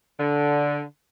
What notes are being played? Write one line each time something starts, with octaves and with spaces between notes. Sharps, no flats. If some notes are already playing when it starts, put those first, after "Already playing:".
D3